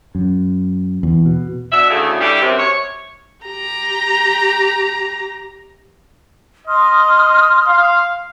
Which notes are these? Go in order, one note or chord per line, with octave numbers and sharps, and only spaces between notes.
F#2
E2
B2
B2 D4 E5
D2 A2 C#3 A3
G3 A3 D4 E4 G4
F#2 C3
C#5
G4 A#5
D#5 C6 D#6 F6
F5